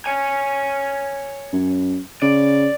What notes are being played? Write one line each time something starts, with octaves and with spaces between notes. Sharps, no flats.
C#5 G#5
F#2
C#3 D5